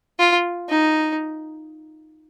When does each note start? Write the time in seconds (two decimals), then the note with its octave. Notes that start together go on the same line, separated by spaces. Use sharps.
0.19 F4
0.69 D#4